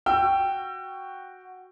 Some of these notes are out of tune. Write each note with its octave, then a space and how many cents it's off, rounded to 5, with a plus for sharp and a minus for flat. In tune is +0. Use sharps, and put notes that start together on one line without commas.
F#4 +0 G5 +0 E6 +35